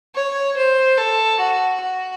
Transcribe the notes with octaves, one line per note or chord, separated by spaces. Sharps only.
C#5
C5
A4
F#4
F#4